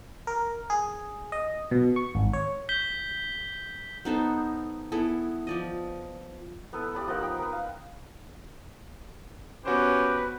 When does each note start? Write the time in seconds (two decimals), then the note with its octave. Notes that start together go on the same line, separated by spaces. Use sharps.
0.27 A#4
0.70 G#4
1.32 D#5
1.71 B2
1.96 C#6
2.15 G#1
2.33 C#5
2.69 G6 B6 G7
4.05 B3 D#4 A4 C5
4.92 B3 E4 G#4 A4
5.47 F3 D5 D#5
6.73 B3 E4 A4 B4
6.95 G4 D5 B5
7.07 F3 D#4 A#4 F#5
7.21 B3 G5 B5
7.39 A#4 B4
7.53 F5
9.65 B3 C#4 F#4 G4 B4 C5